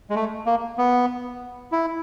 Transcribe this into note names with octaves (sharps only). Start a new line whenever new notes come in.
G#3
A3
A#3
B3
E4